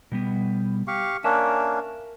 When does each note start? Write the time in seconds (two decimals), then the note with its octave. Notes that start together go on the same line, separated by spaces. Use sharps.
0.12 B2 G3 B3
0.87 G4 F5 C#6
1.24 A#3 C#4 D4 A#4 E5